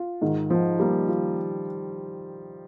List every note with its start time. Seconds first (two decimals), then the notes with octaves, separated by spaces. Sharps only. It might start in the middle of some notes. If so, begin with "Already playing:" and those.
Already playing: F4
0.21 G#2 D#3
0.50 D#3 F3
0.79 G3 A#3
1.08 F4